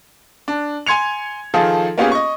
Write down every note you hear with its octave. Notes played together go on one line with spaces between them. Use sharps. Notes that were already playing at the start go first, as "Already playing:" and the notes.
D4
G#5 C6 G#6 C#7 F7
D#3 F3 F4 G#4 A4
A#3 B3 C#4 F4 G4 G#4
D#5 C#6